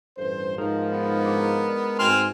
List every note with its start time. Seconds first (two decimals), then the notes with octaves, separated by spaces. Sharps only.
0.18 A1 G2 A4 B4 C5
0.58 G#2 F3 G#3 D#4 A#4
0.90 B3
1.25 D4 G#4 D6
1.64 B4 D5
1.99 G#2 C4 F#4 G#5 C6 F6